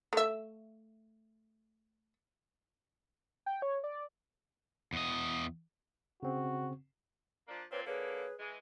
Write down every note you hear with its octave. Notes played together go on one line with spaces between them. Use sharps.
A3 E5
G5
C#5
D5
E2 D#5
C#3 C4 F#4
F3 A#3 D4
A#2 C4 B4 C#5
D3 A#3 G#4 B4 C#5
E3 G#3